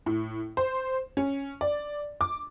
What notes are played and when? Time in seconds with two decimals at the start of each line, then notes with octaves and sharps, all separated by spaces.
0.06 A2
0.57 C5
1.17 C#4
1.61 D5
2.21 D6